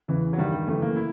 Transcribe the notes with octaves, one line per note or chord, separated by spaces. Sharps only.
E2 C#3 E3
F#3
G2 D#3 G3
G3
F#2 C#3 E3 A3
A#3
E4